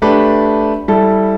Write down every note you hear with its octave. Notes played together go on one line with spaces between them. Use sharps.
A3 D4 G4 B4
G3 E4 A4